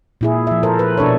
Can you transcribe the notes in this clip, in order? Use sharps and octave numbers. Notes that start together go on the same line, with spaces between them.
A#2 E4 G#4
F3 E5
A4 A#4 C5
B4
B2 D4 A4 C#5